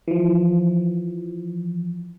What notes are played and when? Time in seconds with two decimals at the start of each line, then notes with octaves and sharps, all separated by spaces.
0.08 E3 F3